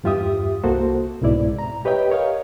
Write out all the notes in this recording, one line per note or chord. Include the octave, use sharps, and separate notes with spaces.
E2 G2 F4 G4 E5 D#6
C2 A#3 F#4 A4 C5
C2 G#2 B2 E4 D5
A#5
G4 B4 C#5 D#5 E5 G5
A#4 C#5 D#5 F5